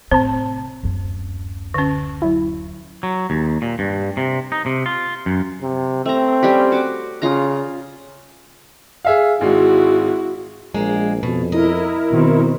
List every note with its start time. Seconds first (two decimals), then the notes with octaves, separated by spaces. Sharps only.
0.11 A2 C3 C4 C5 A5
0.83 D1 F#2
1.74 D3 C#4
2.22 F#3 E4
3.03 F#3
3.30 D#2
3.62 A#2
3.79 G2
4.17 C3
4.52 D#4
4.66 C3
4.86 F4
5.26 F#2
5.61 C3
6.06 A3 C4 A#5
6.43 G3 C#4 G4
6.72 F#4 D6
7.22 C#3 F4 A#5
9.05 G#4 E5 F5
9.41 G#1 G#3 E4 F#4
10.74 A#1 G#3 A#3
11.23 F2 B2
11.52 E4 A#4 D#5
12.11 B2 D#3 C4